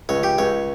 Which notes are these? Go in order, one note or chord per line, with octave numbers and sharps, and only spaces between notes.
C#2 C#5
G4
C#2 C#5